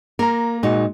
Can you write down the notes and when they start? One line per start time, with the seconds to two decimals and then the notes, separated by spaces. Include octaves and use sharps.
0.19 A#3 A#4 A#5
0.63 A#2 G#3 D#4 F#4